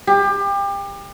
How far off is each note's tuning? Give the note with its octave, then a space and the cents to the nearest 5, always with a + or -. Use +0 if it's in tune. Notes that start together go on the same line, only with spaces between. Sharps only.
G4 +30